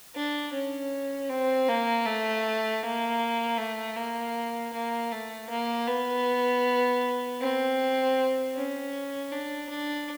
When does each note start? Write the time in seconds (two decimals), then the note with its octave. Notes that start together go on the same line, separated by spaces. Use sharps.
0.16 D4
0.53 C#4
1.29 C4
1.68 A#3
2.06 A3
2.83 A#3
3.58 A3
3.97 A#3
4.73 A#3
5.12 A3
5.50 A#3
5.88 B3
7.40 C4
8.55 C#4
9.32 D4
9.70 D4